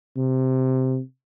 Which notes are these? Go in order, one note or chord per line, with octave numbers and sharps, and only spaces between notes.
C3